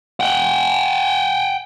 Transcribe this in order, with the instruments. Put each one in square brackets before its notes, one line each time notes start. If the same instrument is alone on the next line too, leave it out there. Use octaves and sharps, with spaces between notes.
[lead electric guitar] F#5 G5